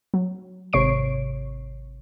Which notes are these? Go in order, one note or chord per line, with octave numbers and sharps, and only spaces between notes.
F#3
G#1 C3 C#5 C#6 C7 D7